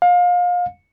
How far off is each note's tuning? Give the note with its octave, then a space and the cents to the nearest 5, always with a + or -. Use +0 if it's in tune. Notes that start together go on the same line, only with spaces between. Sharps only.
F5 +30